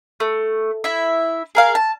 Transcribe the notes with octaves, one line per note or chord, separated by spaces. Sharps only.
A3
E4 E5
G#4 A#4 F5
A5